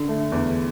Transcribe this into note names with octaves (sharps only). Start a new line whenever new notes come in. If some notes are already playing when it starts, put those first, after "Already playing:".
Already playing: D3
A3
E2